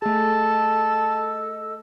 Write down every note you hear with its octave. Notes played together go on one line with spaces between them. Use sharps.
A3 G#4 A4 D#5 A5 E6